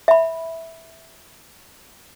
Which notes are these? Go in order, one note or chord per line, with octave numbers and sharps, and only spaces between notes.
E5 B5